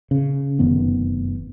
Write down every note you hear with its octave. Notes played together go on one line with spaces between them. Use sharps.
C#3
F1 F#2 D#3 B3